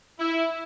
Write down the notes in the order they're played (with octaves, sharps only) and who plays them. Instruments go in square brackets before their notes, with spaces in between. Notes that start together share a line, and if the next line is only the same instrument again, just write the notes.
[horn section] E4